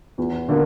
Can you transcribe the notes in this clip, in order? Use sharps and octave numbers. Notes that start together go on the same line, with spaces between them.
E2
D3 A#3